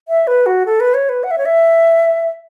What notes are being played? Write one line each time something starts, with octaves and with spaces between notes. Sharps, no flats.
E5
B4
F#4
A4
B4
C#5
B4
F#5
E5
C#5
E5